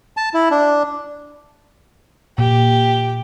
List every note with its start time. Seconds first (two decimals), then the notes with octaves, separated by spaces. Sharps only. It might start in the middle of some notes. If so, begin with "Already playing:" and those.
0.17 A5
0.34 E4
0.51 D4
2.38 A#2 G4